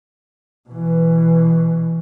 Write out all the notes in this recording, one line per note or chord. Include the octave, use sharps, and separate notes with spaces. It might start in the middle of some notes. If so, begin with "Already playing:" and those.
B2 E3